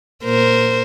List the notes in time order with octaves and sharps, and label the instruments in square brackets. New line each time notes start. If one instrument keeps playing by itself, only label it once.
[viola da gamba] A#2 A#4 C5